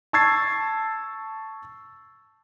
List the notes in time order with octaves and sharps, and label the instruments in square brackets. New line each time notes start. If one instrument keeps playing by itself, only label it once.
[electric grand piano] A5 C#6 E6 G#6 A6 C7